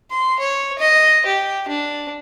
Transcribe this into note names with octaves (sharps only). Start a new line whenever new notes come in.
C6
C#5
D#5
G4
D4